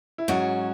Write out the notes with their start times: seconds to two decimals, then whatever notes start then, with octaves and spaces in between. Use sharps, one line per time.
0.18 E4
0.28 G#2 F#3 C#4 F#4